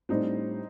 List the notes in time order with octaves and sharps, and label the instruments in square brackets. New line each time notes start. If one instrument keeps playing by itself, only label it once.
[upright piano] A2 G3 D4 [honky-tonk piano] C4 D#4